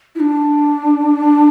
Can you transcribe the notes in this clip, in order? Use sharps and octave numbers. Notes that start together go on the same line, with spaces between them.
E4
D4